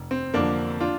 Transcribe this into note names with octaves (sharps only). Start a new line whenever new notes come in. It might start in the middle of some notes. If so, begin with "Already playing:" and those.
Already playing: F1
C4
F2 D3 F3 A#3 D4
D4 F4